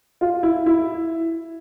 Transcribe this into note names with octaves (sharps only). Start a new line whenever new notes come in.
F4
E4
E4